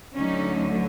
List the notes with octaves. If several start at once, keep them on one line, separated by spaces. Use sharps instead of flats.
D2 D3 F#3 A3 C#4 D#4